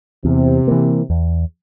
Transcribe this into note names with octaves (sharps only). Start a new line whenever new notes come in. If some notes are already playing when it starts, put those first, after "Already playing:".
E2 C3
E3 A#3
E2